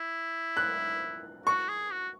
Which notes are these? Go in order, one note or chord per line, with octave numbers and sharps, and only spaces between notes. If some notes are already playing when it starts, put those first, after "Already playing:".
Already playing: E4
F#6
F#4 C#6
G#4
F#4